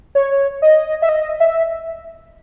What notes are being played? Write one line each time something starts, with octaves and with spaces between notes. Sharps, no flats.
C#5
D#5
E5
D#5
E5